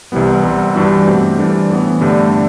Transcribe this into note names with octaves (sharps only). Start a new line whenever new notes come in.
C2 C3 E3 G3 B3
C2 C3 G3
G2 E3 G3 D4 F#4
B2 A3 C4 G4
E3 G3 D4 A4 C5
A2 E3 B3
G2 D3 A3 D4 G4